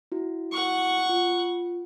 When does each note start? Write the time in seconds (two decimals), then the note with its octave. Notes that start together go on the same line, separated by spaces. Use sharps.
0.12 E4 F#4
0.52 F#5 C#6
1.09 F4